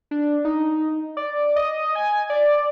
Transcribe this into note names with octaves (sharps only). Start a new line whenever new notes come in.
D4
D#4
D5
D#5
G#5
D5